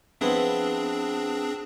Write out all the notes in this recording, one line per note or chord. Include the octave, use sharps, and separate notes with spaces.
F3 B3 C4 D4 E4 G#4